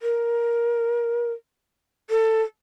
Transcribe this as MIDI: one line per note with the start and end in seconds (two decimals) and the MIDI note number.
0.02 1.32 70
2.10 2.42 69